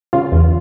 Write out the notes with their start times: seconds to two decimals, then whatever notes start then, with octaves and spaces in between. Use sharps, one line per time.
0.13 C#3 F4
0.32 E2